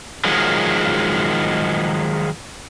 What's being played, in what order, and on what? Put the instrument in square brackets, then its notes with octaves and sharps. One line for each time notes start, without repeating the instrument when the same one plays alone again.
[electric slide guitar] D#3 F3 F#3 G#3